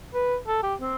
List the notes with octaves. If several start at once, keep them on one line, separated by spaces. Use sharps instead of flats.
B4
A4
G4
C4